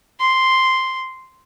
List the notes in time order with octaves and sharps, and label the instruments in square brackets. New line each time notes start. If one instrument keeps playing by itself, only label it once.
[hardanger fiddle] C6